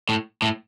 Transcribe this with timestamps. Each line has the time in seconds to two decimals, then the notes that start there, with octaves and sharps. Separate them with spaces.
0.09 A2
0.42 A2